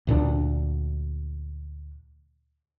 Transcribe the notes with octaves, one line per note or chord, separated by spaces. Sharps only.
D2 A#2 G3 D4